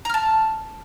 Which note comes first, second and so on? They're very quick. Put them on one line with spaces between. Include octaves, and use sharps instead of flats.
A#5 F6 A5